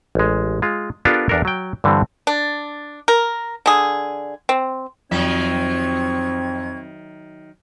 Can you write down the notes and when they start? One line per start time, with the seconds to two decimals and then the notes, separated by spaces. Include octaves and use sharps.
0.15 A1 G#3
0.62 G#3 F4
1.05 B3 D4 F4 G4 A4 A#4
1.29 E2 D4 A4 A#4
1.45 F#3 G5
1.84 G2 D3 E3 G3 C4
2.27 D4
3.08 A#4
3.66 D3 G#4
4.49 C4
5.11 F2 D#3 F#3 C4 E5 C#6 G#6